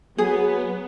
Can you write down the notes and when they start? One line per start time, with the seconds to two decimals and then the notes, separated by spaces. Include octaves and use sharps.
0.18 F#3 B3 G#4